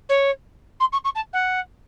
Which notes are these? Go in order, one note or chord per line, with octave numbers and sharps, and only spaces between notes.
C#5
C6
C#6
C#6
A5
F#5